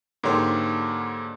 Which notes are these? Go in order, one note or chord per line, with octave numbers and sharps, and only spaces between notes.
G#2 D3 A#3 G4 C#5 C6